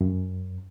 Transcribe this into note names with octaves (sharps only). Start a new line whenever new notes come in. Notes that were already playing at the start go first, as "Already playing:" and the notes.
F#2